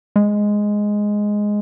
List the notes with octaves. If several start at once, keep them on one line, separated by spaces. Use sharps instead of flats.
G#3